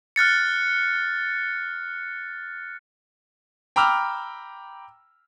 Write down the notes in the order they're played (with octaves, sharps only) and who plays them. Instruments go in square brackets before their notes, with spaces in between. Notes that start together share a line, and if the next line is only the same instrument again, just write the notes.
[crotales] F6 F#6 A6 C#7
[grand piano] G5 A#5 B5 D6 E6 F6